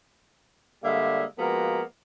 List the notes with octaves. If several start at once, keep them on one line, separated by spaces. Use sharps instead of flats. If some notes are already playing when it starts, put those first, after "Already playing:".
D3 G3 G#3 A#3 E5 F5
F3 G#3 A#3 B3 F#4 A#4